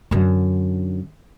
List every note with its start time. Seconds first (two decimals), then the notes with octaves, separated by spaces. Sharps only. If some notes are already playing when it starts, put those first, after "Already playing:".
0.11 F#2 D3